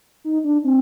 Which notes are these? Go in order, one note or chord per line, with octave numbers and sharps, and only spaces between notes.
D#4
D4
C4